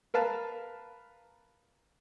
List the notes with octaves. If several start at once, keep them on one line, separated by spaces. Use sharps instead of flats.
A#4 B4 F5 A5